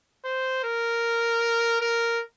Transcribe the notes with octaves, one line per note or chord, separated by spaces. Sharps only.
C5
A#4
A#4